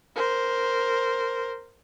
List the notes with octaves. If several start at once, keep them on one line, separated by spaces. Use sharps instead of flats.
A#4 C5